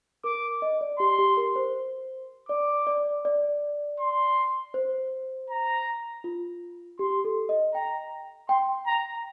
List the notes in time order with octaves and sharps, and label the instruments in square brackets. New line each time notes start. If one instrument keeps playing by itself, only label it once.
[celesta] A#4 [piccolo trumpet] D6
[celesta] D#5
D5
[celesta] G4 [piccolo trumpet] C6
[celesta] G4
A#4
C5
[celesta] D5 [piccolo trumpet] D6
[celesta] D5
D5
[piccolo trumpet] C6
[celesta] C5
[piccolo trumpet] A#5
[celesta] F4
[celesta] G4 [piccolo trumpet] C6
[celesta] A4
D#5
[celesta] G5 [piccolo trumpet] A#5
[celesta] G5 [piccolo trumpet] C6
[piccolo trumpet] A#5